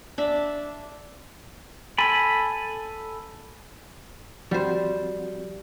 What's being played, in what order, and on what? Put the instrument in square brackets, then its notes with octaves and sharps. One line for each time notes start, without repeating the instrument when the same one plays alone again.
[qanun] D4 E5
[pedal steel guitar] A4 G#5 B5
[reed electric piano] F3 C4 F#4 [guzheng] G3 C5